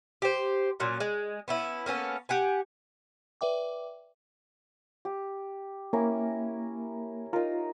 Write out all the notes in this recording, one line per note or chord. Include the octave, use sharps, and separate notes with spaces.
G4 C5
A#2 F#3 C#4
G#3
B3 C#4 E4
A#3 B3 C#4 A4
G4 F#5 G#5
B4 D5 E5 G5 D6
G4
A#3 C#4 E4 A#4
D#4 F4 A#4